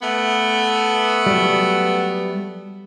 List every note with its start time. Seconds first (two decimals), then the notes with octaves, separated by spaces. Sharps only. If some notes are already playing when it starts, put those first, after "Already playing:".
0.02 A3 B3
1.26 F#3 G3